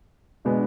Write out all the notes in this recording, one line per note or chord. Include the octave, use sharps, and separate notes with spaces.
B2 G#3 B3 D4